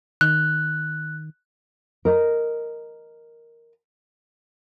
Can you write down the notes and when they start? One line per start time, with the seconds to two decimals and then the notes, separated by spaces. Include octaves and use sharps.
0.21 D#3 F#6
2.05 A#4 D#5